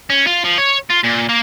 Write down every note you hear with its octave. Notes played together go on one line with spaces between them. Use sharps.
C#4
F4
F3
C#5
F4
A#2
A#3